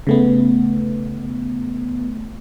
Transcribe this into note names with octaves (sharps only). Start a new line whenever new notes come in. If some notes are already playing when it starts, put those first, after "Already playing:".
C#3 A3 B3